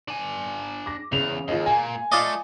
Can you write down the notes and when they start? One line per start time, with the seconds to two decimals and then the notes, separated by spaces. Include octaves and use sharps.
0.08 D4 G#5
0.86 D6 A#6
1.12 E2 C#3 F7
1.48 D#2 F4 G#4 D#5
1.66 A#2 A#3 G#5
2.12 A3 F4 D5 D#5